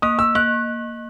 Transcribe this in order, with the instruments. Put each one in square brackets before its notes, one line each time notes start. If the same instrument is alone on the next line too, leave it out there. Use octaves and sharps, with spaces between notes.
[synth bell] A#3 [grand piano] D#6
[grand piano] E6
[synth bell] A#3 [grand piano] F#6